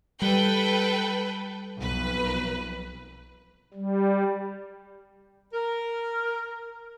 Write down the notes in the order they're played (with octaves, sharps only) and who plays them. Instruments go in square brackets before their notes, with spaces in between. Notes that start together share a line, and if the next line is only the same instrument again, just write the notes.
[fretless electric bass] G3 [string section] A4 B4 G5
[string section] B1 F2 B4
[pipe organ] G3
[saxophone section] A#4